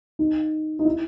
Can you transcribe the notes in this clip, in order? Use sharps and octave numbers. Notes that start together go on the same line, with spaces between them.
D#4
D#4
E4